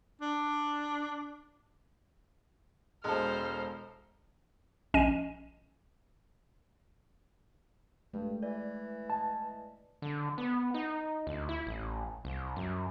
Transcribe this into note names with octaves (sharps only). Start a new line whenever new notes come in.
D4
E1 G#3 A4 C5 A5 F6
A#1 C#4 D#5 D#7
G2 G#3 A3
E3 D5
D#5 A5
D3
B3
D#4
D2
E4
A1
C2
F#2